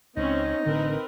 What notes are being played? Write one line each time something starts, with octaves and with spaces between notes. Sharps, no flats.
C#2 C4 C#4 D#4
A1 D3 C4 D4 A#4 B4